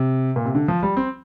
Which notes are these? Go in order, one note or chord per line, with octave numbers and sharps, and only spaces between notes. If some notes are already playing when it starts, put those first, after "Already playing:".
Already playing: C3
A#2
C3
D3
F3
G3
C4